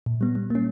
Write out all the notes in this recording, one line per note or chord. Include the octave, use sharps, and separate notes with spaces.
A#2
G3 B3
G3
A#3 C#4